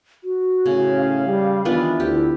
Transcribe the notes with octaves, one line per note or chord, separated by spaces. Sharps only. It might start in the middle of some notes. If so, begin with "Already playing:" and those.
F#4
A2 C#3 C#4
F5
G3
D#3 E3 B3 D4 F4
D2 E4 G4